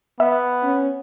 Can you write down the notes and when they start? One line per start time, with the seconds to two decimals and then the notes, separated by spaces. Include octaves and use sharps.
0.20 B3 E5
0.63 C#4